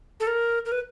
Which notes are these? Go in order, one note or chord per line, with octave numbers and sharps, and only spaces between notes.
A4
A#4
A#4
B4